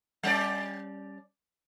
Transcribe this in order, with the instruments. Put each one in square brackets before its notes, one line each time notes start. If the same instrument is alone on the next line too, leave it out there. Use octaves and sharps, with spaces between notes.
[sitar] G3 C#4 D5